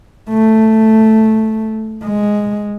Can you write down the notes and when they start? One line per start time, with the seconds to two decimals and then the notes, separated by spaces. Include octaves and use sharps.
0.30 A3
2.05 G#3